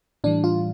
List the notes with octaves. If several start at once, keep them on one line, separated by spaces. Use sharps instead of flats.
A2 E3 G3 D4
F4